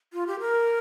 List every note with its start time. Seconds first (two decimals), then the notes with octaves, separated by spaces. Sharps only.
0.13 F4
0.27 G4
0.40 A#4